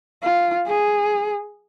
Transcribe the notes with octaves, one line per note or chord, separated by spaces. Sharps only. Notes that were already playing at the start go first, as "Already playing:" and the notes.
F4
G#4